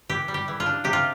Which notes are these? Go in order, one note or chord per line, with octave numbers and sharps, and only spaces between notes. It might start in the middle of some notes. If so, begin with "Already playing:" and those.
E3 G4
G3
G4
E3
F4
D4
C3 G4
F4